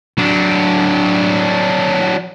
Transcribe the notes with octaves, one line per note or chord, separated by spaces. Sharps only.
F#3 D4